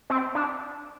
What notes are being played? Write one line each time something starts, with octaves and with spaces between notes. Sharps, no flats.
C4
D4